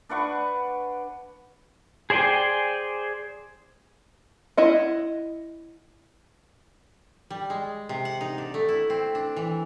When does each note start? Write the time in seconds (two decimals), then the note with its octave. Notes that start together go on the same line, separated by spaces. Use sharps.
0.09 D4 B4 F#5 C#6
2.10 G#4 C5 D5 G5 G#5
4.57 E4 D#5 F#5
7.30 G3
7.50 G#3
7.89 C3
8.05 F#5
8.21 D#4
8.38 D4
8.54 A3
8.69 E4
8.90 C4
9.15 D4
9.36 E3